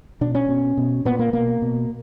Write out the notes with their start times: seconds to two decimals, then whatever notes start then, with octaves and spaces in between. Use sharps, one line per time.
0.21 B2 D4
0.35 C#4
0.49 B2
0.77 B2
1.05 A#2 B3
1.19 A#3
1.33 B2 A#3
1.62 B2